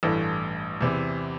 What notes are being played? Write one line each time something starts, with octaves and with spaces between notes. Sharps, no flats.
A1 G2 E3 A3
E2 C3 E3